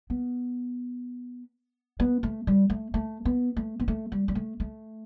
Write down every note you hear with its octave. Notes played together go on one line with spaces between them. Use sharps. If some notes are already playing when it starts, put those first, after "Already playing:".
B3
B3
A3
G3
A3
A3
B3
A3
B3
A3
G3
G3
A3
A3